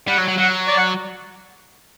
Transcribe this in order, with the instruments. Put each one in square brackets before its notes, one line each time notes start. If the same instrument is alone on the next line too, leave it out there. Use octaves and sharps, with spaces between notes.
[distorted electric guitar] G3 [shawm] F#5
[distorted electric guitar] F#3
F#3
[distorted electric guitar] F#3 [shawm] F#5
[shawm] D5
F#5